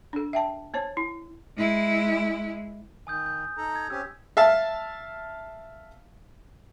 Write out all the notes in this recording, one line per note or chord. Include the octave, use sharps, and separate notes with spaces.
D4 A4
E5 G5 A5
B3 C5 C#5 A5
E4
G#3 E4
D#3 G#5 D#6 G6
G6
D#4 A4 A#5
G#6
C4 C#4 G4 E6
E5 F5 A5